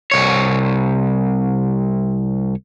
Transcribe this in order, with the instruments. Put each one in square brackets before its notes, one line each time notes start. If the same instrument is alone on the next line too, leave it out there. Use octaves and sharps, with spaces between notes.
[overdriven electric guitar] C2 C#5